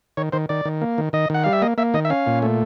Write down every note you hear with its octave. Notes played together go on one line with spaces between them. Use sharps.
D#3 C#5
D#3 C5
D#3 D5
D#3
A#3
D#3
D#3 D#5
D#3 F#5
G3 F5
E5
A#3 D#5
A#3 E5
D#3 D#5
E5
C#4 F5
A#2
A3